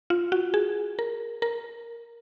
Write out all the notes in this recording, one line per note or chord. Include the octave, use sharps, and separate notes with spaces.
F4
F#4
G#4
A#4
A#4